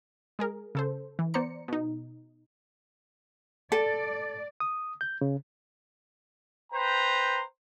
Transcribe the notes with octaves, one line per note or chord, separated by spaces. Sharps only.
G#3 G#4 A#4
C#3 A4 C5
E3
B3 C5 D5 A#5 C#7
B2 D#4
A4 D5
D#6
G6
C#3
B4 C5 G5 A#5